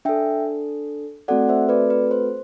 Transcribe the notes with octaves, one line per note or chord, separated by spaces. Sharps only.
D4 A4 E5 G5
A3 C4 F#4 A4 D5 F#5
C5 E5
B4 D5
B4
C5